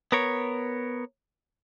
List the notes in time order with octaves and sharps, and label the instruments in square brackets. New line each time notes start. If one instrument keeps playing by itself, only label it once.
[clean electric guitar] B3 A#4 C#5